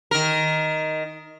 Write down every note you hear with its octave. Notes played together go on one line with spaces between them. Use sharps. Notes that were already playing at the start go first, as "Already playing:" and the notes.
D#3 A#4